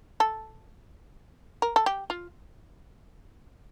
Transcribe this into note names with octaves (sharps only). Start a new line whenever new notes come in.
A4
A#4
A4
G4
F4